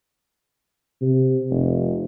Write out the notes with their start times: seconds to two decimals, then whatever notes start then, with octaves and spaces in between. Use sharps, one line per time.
1.01 C3
1.50 F1